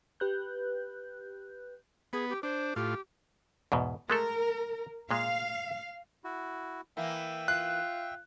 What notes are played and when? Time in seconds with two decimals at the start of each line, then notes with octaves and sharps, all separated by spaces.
0.20 G4 B4 F#6 G6
2.13 B3 G#4
2.30 G4
2.43 D4 C5
2.76 A2 F4 G4
3.72 E2 G#2 B2
4.10 G#3 A3 A4 A#4
5.11 A#2 G#3 F5
6.24 E4 F#4
6.97 E3 A#3 E5 G5
7.48 F4 F#6